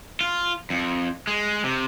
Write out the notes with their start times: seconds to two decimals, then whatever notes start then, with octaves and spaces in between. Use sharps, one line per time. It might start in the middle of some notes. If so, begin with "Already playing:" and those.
0.21 F4
0.70 F2
1.27 G#3
1.64 C3